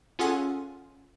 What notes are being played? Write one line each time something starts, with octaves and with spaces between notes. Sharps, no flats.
C#4 F4 G#4 A4 F#5 G#5